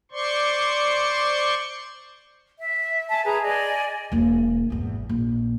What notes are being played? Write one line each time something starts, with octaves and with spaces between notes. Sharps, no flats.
C5 D5 C6 C#6
E5
E5 G#5 A5
G#4 B4 G#5 A#5
D5 D#5 G#5
E1 A#3
G#1 E2
A#1